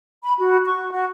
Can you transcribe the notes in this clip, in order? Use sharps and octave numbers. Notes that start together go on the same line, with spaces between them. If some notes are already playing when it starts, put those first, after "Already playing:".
B5
F#4
C#6
F#4